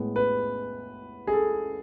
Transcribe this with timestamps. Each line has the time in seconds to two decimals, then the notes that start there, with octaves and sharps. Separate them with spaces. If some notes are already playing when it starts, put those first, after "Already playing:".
Already playing: A2 G#3 B3
0.16 B4
1.27 G#4
1.33 A4